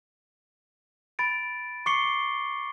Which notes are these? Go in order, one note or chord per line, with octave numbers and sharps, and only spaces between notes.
B5 A6 D7
C#6 D6 C7 C#7 G7